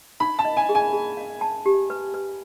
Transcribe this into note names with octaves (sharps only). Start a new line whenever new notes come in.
D#4 B5
A5
D#5
G#5
G#4
G#5
G#4
F5
A5
G4
B4
B4